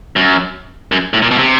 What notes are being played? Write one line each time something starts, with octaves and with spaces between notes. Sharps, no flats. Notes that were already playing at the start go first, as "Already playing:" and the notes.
F#2
F#2
A2
A#2
B2
C3